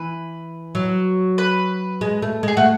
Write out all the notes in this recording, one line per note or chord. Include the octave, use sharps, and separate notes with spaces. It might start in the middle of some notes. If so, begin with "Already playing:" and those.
Already playing: E3 B4
F#3
B4
G#3
A3
G#3 G#4
A3 F#4